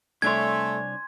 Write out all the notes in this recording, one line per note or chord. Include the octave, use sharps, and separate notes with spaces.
C2 A3 D4 C#5 G#5 C6 G#6